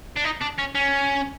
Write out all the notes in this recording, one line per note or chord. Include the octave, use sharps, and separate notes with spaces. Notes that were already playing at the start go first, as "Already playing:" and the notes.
D4
D#4
D4
C#4
C#4